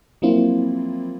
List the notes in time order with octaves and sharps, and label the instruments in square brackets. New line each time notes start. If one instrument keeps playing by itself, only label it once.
[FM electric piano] F3 F#3 A#3 C4 E4 F4